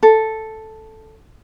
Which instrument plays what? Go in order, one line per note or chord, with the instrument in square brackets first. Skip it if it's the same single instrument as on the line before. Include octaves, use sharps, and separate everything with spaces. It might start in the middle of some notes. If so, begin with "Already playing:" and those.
[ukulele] A4